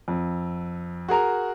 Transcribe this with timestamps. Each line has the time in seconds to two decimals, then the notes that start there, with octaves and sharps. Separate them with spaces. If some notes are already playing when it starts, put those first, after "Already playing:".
0.08 F2
1.09 F#4 G#4 A#4 A#5